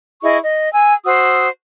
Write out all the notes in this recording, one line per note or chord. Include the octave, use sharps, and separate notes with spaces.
E4 G#4 D#5 C#6
D#5
G#5 E6
F#4 C5 D#6 E6